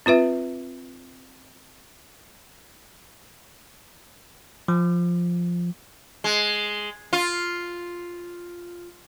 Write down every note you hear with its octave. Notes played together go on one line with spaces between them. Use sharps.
C4 F4 B4 E5
F3
G#3
F4